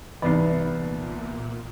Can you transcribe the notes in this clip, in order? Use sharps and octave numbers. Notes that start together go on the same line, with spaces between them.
C2 E3 B3 D#4 D5
A#2